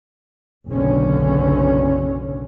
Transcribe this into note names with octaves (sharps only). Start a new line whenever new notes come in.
F#1 B1 F#2 B2 D3 C#4